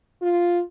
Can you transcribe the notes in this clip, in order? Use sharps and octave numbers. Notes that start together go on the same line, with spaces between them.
F4